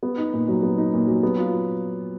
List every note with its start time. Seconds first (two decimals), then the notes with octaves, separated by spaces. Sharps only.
0.03 B3
0.18 D#4
0.34 A#2
0.48 F#3
0.63 B3
0.78 D#4
0.93 A#2
1.07 F#3
1.23 B3
1.37 F4